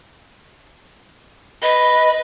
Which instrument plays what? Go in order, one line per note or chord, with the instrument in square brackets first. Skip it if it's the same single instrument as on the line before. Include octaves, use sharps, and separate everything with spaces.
[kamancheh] B4 [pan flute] D#5